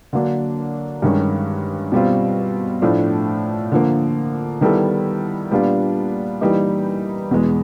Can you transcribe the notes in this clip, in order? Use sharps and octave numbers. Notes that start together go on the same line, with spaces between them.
D3 F#3 A#3 D4
G2 D#3 G#3 C#4
B2 G3 C4 F4
A2 F3 A3 D4
D3 F3 A#3
D#3 G3 B3 E4 A4
A#2 G3 B3 D4 F4
E3 G3 A#3 D#4 G4
E2 B2 G#3